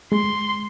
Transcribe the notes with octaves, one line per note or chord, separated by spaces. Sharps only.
G#3 C6